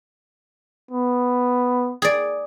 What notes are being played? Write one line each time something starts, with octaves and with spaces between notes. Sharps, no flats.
B3
G#4 D5